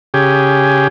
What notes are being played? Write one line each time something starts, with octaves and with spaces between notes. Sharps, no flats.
C#3 G4 G#4